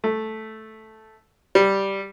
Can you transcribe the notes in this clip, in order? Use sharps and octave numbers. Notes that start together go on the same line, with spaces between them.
A3
G3